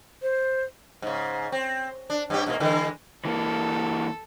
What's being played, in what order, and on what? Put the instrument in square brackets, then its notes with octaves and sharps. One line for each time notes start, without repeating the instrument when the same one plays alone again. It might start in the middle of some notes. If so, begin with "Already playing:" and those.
[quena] C5
[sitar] G#2 C#3
C4
D4
G2 C#4 G4
G#2 B2 A#3
D3 E3 G#3
[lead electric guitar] E3 A#3 [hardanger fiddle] A4